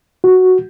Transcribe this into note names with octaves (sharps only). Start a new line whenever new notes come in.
F#4